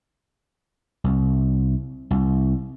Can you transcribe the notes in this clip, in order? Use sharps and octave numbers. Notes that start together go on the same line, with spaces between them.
C2
C2